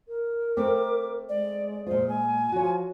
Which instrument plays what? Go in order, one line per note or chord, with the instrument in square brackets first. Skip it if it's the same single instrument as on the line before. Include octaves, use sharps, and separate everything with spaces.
[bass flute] A#4
[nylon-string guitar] A3 C4 [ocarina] D6
[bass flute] G#3 [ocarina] D5
[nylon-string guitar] A#2 F4 [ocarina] C5
[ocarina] G#5
[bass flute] F3 [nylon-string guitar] F#4 C#5